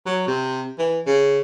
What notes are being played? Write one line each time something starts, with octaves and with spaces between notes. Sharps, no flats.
F#3
C3
E3
C#3